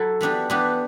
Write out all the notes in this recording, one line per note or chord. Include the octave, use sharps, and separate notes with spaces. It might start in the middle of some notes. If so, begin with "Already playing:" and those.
Already playing: F#3 E4 A4
E3 B3 D4 G4
E3 B3 D4 G4